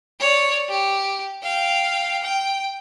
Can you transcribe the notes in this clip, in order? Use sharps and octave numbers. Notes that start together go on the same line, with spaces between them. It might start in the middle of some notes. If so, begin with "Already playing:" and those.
C#5 D5
G4
F5 G5
G5